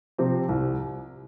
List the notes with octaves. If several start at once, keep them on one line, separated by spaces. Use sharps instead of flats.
C3 F3 C4 G4
C2